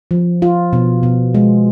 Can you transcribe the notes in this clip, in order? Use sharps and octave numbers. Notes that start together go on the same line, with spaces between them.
F3
F4
B2
B2
G#3